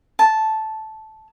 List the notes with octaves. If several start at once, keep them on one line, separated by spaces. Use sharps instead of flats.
A5